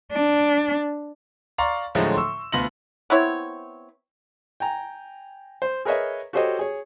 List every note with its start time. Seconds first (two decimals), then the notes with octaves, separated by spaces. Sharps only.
0.12 D4
1.58 D5 F5 A#5 C6 C#6
1.95 A2 D3 F3 F#3 G#3 A3
2.14 C6 C#6 E6
2.52 D2 B3 F4 C6 A#6 F#7
3.10 B3 C4 E4 C#5
4.60 G5 G#5 A#5
5.62 C5
5.85 G#4 A#4 B4 C#5 D#5 E5
6.33 F#4 G4 A4 C5 C#5 D#5
6.59 G#4 C#5